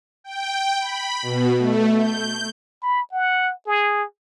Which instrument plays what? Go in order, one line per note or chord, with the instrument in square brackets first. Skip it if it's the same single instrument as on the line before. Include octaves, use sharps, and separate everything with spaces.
[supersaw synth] G5
B5
B2
A3
G6
[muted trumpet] B5
F#5
G#4